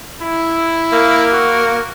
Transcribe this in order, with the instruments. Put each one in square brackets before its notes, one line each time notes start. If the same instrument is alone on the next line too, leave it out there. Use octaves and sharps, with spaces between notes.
[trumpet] E4
[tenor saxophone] A#3
[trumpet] F#4